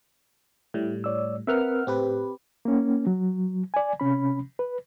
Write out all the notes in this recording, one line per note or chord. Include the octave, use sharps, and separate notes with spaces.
A2 G3 E4
C#5 D5 E6
C4 A#4 B4 E5 F#5 F6
A2 C4 G4 B4
A#3 C#4
F#3
D5 G#5
C3 C#4 B5
B4